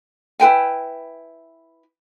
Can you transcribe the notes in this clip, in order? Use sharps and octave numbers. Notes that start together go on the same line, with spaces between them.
E4 B4 G5 G#5